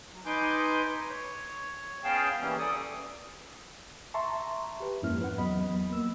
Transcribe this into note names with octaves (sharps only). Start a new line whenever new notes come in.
F#3
D#4 B4 G#5 C6 D6 G6
C#5
B3 C#4 G#4 F5 G5 A5
E3 G3 A#3 C#4
A4 D5 D#6
E5 A5 A#5 C6 C#6
G4 B4
F2 G#2 A#3 C#4 E4 F6
B4 F#5
E2 F#3 B3 D#5 B5
A#3 E6